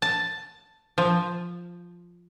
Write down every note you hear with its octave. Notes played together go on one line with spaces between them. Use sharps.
A5
F3